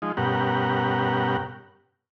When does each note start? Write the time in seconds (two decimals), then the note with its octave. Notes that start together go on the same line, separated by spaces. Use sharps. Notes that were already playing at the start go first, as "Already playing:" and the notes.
0.02 F3 G#3 D#4
0.17 G2 B2 C#4 G4 A#4 F#5